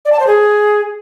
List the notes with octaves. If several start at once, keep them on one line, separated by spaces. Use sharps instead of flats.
D5
A5
C5
G#4